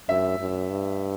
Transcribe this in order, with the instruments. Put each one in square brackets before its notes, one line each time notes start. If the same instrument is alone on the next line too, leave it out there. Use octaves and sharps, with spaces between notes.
[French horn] F#2 [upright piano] E5
[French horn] F#2
G2